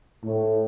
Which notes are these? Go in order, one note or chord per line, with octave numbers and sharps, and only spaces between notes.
A2